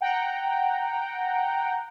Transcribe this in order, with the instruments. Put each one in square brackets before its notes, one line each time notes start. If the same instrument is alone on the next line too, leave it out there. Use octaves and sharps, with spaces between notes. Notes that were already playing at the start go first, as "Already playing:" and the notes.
[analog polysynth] F#5 G5 A#5